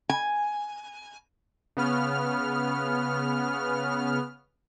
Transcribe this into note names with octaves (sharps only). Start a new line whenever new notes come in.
G#5
C#3 B3 F6